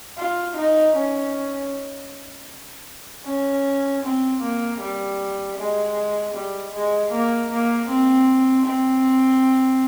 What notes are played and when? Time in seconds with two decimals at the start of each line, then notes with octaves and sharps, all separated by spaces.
0.17 F4
0.56 D#4
0.95 C#4
3.25 C#4
4.03 C4
4.42 A#3
4.80 G3
5.57 G#3
6.34 G3
6.73 G#3
7.11 A#3
7.50 A#3
7.88 C4
8.65 C4